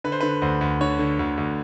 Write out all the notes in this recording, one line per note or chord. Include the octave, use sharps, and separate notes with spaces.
D3 B4
C5
D3 B4
D2 C5
D2
D3 C#5
D3
D2
D2